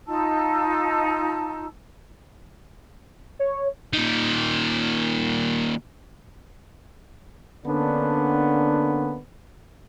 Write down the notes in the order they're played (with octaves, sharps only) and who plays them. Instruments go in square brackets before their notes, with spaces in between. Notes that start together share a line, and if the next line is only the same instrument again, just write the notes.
[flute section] D#4 F4 A5 E6
[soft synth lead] C#5
[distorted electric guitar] A#2 D#3
[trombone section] D3 A#3 B3 C#4 D4